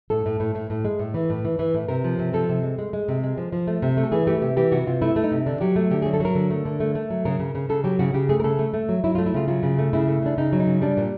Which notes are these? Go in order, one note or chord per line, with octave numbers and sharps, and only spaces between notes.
A2 A4
A2
A2
A2
A2
G#3
A2
E3
A2
E3
E3
A2
C3 A#4
F3
C3
F3 A4
C3
G#3
G#3
G#3
C3
G#3
F3
F3
A3
C3
A3
A4
E3 G#4
A3 G4
C3 G4
E3 G4
C3 F#4
C3 F4
A3 E4
A3
D#4
C3
D3 D4
F#3 G4
A3
D3 G4
F#3 G#4
A4
F#3 A#4
D3
A3
D3
A3
A3
F#3
C#3 A#4
C#3
C#3
C#3 A4
F#3 G4
C#3 F#4
C#3 G4
A3 G#4
A#4
C#3 A4
A3
A3
F#3
F#3 E4
A3 F4
E4
C#3 F4
F#3 F4
C#3
A3
C#3 E4
A3
C#3 D4
C#3 D#4
F#3
D#4
C#3
G3 D4
A#2